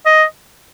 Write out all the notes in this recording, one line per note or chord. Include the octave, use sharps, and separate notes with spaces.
D#5